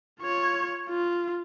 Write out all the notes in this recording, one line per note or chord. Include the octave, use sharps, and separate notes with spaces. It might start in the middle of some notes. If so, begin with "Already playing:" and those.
F4 C#5
F4